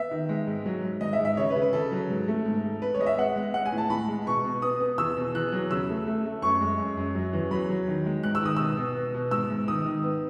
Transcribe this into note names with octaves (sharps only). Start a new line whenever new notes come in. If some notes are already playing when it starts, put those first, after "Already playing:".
Already playing: B3 E5
D#3
G#3
G#2
F#3
G#2
G#2 D#5
E5
G#2
E5
C#3 C#5
B4
C#3
B4
C#3 A4
F#3
G#2
A3
G#2
G#2
B3 B4
C#5
G#3 D#5
E5
B3 F#5
G#3
G#3 F#5
G#5
A2
A5
A2 B5
G#3
B2 C#6
B2
B3 D#6
B3
E2 E6
B2
E2 F#6
F#3
C#3 E6
A3
A3
A3
F#2 C#6
G#3
F#2
F#2
F#3
E2
F#3 B5
F#3
D#3
G#3
G#2 F#6
E6
D#3 D#6
B2 E6
B2
B2
B2
G#2 E6
G#2
D#3 D#6
D#3
B3